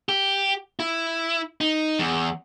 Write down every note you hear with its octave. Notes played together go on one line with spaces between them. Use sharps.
G4
E4
D#4
E2